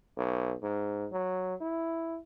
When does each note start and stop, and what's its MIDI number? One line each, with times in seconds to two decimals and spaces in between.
0.17 0.55 35
0.62 1.07 44
1.12 1.55 54
1.61 2.19 64